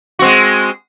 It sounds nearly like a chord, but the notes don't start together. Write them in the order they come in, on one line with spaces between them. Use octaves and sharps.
F#4 C4 G#3